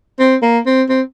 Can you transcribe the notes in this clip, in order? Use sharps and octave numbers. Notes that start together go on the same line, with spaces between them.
C4
A#3
C4
C4